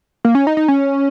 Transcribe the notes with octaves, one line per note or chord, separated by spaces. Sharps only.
A#3
C#4
D#4
D#4
C#4